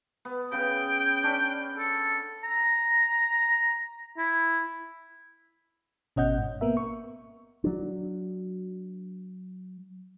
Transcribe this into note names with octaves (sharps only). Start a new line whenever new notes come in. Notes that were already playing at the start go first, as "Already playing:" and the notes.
B3
C#3 B3 G5
C#4 D4
A4
A#5
E4
G#1 B2 C#4 D#5 F#5 G6
G#2
A#3 B3 A#4 E5
C#6
F#3 D4